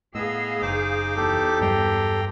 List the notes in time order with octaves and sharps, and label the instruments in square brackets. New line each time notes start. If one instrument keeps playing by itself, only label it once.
[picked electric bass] A2 [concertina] B3 D#5 E6 [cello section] G#4 F5
[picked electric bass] F#1 [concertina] D#4 C5 D6
[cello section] E2 [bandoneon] G4 A4
[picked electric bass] G2 F#3 G3 [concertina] G5 A#5 C6